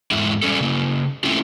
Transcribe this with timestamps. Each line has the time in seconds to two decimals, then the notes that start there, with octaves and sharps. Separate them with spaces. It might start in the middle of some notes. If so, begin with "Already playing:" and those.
0.11 E2 G#2 G#3 E4
0.42 G3 C#4 A4
0.61 C#3 A#3
1.24 A3 C4 C#4 E4 F4